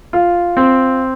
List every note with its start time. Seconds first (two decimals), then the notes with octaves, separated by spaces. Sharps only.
0.13 F4
0.57 C4